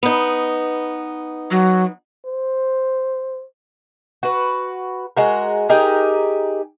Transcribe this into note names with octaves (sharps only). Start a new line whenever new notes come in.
B3 D#4
F#3
C5
F#4 B4
G#3 F#4 A#4
D#4 G4 G#4 A#4